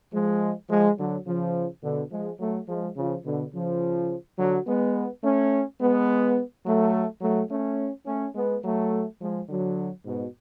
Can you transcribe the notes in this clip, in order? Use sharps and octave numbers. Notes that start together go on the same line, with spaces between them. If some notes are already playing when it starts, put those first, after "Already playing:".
F3 G#3
F3 G#3
D3 F#3
C#3 F3
B2 D3
F3 G#3
F#3 A3
F3 G#3
C#3 F3
B2 D3
C#3 F3
D3 F#3
G#3 B3
A3 C#4
G#3 B3
F#3 A3
F#3 A3
A3 C#4
A3 C#4
G#3 B3
F#3 A3
F3 G#3
D3 F#3
G#2 B2